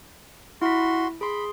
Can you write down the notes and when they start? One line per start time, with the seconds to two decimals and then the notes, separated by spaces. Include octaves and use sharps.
0.62 E4 F#4 C6 B6
1.21 G#4 B5 C6